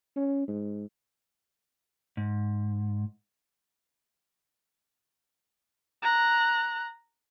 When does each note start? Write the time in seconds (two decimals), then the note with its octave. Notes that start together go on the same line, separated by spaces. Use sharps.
0.16 C#4
0.48 G#2
2.17 G#2
6.02 A#5 F#6